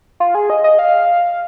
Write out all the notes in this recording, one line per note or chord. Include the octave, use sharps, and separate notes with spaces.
F4
G#4
D#5
D#5
F5